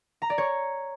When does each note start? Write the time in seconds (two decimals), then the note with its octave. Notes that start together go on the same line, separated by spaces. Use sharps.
0.22 A#5
0.30 D5
0.38 C#5